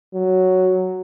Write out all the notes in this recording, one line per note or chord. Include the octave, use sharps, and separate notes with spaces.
F#3